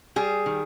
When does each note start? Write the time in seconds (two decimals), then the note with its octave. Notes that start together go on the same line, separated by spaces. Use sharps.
0.16 G3 G#4
0.46 D#3